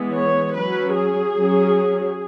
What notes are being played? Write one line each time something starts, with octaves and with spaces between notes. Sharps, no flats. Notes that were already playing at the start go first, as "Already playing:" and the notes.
Already playing: E3 G#3 B3
C#5
F#3 C#4 B4
G#4
F#3 C#4